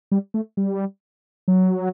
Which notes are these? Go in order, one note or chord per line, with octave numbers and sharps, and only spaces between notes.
G3
A3
G3
F#3